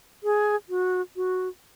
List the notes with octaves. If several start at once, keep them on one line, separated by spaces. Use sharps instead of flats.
G#4
F#4
F#4